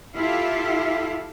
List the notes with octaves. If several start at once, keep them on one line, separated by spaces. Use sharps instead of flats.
E4 F4 G4 A4 E5 F5